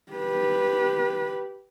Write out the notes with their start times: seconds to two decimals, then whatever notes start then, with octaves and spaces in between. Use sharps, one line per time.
0.12 G4 B4